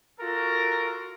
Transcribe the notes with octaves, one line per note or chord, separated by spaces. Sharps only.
F4 F#4 A4 A#4